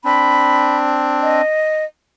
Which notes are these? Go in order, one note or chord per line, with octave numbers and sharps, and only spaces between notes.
C4 D4 B5
D#5